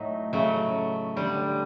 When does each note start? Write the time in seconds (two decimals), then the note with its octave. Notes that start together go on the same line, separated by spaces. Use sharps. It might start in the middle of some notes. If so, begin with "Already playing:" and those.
Already playing: A2 F#3 A3 D#4
0.33 C#3 F#3 A3
1.16 D3 G3